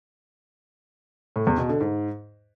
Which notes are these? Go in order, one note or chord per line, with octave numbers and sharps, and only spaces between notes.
A2
E2
B2
D3
G#2